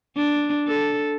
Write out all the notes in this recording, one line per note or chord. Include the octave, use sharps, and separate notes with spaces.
D4
A4